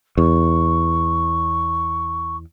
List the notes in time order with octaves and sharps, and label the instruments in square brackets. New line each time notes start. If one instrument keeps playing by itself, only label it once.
[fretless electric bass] E2 [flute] C#6